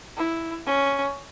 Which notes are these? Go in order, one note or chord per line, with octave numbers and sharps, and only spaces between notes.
E4
C#4